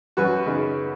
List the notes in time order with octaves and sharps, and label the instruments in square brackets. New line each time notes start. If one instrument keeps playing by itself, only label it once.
[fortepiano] F#2 F#4 B4
C#3 B3 D#4